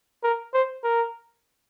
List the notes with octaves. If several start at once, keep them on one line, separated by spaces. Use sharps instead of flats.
A#4
C5
A#4